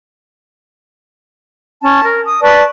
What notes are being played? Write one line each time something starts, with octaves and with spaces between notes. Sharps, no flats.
C#4 A5
A#4
D#6
B4 D5 A5 C#6